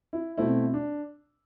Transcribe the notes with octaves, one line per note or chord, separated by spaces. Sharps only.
E4
B2 A3 C4 E4
D4